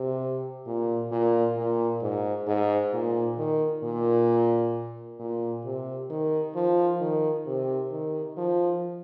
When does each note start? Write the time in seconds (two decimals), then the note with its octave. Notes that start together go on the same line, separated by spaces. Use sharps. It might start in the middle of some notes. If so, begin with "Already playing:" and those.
Already playing: C3
0.67 A#2
1.12 A#2
1.57 A#2
2.02 G#2
2.47 G#2
2.93 A#2
3.38 D#3
3.84 A#2
5.20 A#2
5.65 C3
6.10 D#3
6.56 F3
7.01 D#3
7.46 C3
7.91 D#3
8.37 F3